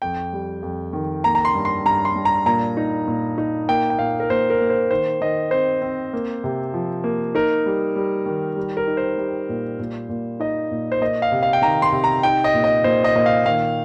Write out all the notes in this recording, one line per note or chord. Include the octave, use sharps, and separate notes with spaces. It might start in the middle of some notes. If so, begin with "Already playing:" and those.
F2 G5
G3
F2
D#3
A#3 A#5
A#5
C6
G2
C6
G2 A#5
C6
G2
A#5
A#2 A#5
D#4
A#2
D#4
A#3 G5
G5
A#2 F5
A#4
A#2 C5
A#4
A#3
C5
D#3 C5
D#3 D#5
C4 C5
C4
A#3
C3
F3
A#3
D#4 A#4
G3
G3
D#3
G3
A#4
D#4
C5
G3
A#2
A#2
A#2
D#4 D#5
A#2
C5
A#3 D#5
F5
C3
F5
G5
D#3 A#5
C6
C3
A#5
D#4 G5
D#5
A#2
D#5
A#2 C5
D#5
A#2 D#5
F5
D#3 F5